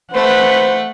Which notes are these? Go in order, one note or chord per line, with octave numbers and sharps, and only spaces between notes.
A3 B4 C5 F#5